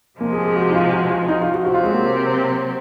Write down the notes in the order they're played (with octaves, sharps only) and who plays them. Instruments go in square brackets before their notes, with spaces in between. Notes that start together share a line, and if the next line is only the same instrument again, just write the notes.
[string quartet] C3 F3 G#3 [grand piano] A#3
[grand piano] G#4
G#4
F#4
D#4
F4
F#4
F4
D#4
F4
F#4
[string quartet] C3 F#3 C4 [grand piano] F#4
[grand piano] F4
G#3
A#3